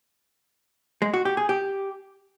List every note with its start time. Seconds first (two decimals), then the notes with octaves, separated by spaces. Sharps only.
1.02 G#3
1.14 F#4
1.25 G4
1.37 G#4
1.49 G4